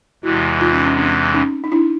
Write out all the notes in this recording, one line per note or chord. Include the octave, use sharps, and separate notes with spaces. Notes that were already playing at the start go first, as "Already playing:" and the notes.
E2 C3 E3 G#3 E4 F#4
D#4 F4
C#4 D#4
C#4
C4 D4
C#4 D#4
D#4
D4 E4